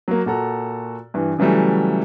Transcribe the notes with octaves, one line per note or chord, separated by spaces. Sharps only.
F#3 A#3
A#2 F#4 A4 A#5
G2 E3
C#3 E3 F#3 G3 A3